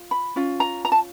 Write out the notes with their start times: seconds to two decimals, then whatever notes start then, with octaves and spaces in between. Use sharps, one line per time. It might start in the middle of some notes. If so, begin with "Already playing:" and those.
Already playing: F4
0.11 B5
0.36 C#4 F4
0.60 A#5
0.85 A#5
0.92 A5